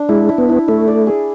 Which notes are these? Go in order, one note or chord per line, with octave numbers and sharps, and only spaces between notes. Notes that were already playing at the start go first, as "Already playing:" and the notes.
Already playing: D4
G#3 E4
E4
B3
E4
A3 E4
D5
G#4